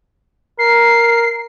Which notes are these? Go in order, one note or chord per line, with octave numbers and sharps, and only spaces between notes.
A#4 C7